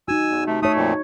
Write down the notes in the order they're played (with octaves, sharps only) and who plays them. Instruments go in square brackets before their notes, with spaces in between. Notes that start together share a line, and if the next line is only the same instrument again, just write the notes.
[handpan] D#4 F#4 [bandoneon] G#5 E6
[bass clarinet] E2
[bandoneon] C3 [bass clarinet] A3
[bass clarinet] A3 [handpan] D#4 C#5 [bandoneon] D#6
[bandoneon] F2 A#2